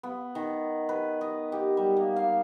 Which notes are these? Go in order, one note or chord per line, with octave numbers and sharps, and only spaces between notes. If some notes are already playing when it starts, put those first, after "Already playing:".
B3
D#3
B4
D#5
G4
G3
A#3
F5